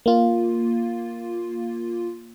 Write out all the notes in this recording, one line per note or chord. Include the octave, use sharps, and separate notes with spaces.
A#3 F4